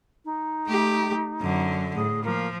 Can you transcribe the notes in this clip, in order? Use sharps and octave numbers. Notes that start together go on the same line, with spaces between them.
D#4
A3 G4
F#2 D3
A2 G#4
F3 A#3